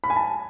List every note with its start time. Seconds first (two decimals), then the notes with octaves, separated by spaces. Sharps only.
0.04 B5
0.10 G#5
0.16 A5